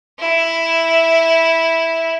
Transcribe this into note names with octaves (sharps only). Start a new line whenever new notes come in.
E4